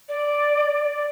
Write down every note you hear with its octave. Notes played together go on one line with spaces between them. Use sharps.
D5
D5